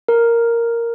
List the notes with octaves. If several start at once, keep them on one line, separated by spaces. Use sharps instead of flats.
A#4